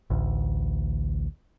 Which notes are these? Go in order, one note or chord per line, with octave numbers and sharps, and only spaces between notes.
A1 D2